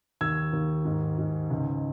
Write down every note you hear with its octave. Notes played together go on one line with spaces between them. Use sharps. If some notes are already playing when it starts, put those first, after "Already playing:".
D#2 E6 G#6
D#2
G#2
G#2
C#2